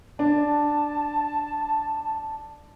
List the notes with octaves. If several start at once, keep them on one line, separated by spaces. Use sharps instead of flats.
D4 A5